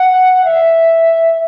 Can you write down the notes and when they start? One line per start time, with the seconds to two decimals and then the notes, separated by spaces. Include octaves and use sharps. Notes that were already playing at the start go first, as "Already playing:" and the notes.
Already playing: F#5
0.45 E5